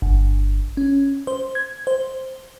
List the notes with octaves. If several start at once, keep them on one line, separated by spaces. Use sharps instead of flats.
G1
C#4
C5
G#6
C5